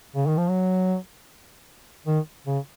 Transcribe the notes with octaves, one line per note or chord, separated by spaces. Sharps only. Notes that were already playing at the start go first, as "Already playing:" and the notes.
C#3
D#3
F3
F#3
D#3
C#3